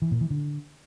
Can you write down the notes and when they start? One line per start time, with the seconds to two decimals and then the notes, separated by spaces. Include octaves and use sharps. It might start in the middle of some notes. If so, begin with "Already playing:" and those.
0.02 E3
0.11 A#2
0.21 E3
0.30 D3